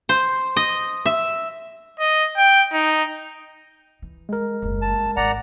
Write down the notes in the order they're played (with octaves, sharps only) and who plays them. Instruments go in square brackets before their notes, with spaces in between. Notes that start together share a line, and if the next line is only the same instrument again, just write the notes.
[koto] C5
D#5
E5
[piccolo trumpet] D#5
G5
D#4
[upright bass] E3
[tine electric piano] G#3 A#4
[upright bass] F#1 D#2
[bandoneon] A5
[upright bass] C#4
[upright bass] G#1 D4 [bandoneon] D5 F#5 A#5